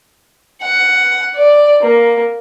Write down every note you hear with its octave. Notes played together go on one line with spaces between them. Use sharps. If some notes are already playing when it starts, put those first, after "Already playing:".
F#5
D5
A#3